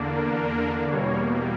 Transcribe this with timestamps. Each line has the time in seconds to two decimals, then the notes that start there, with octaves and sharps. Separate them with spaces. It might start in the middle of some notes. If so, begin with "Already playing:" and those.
Already playing: E2 D3 A#3 D4
0.14 A#4
0.90 E2 B2 G3 A#3 C#5